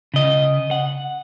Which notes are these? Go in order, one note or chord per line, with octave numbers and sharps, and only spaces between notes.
C#3 D#5
F#5